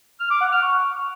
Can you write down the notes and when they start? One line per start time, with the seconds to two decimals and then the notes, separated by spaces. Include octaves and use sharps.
0.20 F6
0.30 D6
0.41 F#5
0.52 F6
0.62 C#6